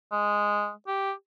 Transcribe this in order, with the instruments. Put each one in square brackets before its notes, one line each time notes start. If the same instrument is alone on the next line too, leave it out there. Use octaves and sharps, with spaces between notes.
[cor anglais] G#3
G4